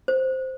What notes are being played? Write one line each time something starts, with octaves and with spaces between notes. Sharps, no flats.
C5